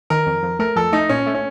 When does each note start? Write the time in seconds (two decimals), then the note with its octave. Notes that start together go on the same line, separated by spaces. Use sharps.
0.10 D#3 A#4
0.26 F2
0.43 F2
0.59 A3 A#4
0.76 F2 A4
0.92 A3 D#4
1.09 A#2 C#4
1.26 A3
1.35 C#4